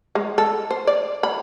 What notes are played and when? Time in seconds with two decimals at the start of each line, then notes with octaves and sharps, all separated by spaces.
0.15 G#3
0.38 A4
0.71 C5
0.87 D5
1.23 B5